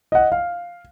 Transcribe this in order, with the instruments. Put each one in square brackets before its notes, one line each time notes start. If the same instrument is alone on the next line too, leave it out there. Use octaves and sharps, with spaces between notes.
[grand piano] D#5 F#5
F5